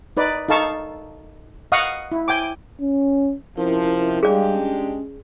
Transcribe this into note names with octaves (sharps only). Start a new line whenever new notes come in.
D#4 B4 D5
D#4 A4 F5 A5 C#6
D#5 F5 F#5 C#6 D#6
E4
G5 G#5 D6
C#4
C3 F3 C#4 E4 A#4
G3 G#3 D4 G4 G#4 D5 F5
C#4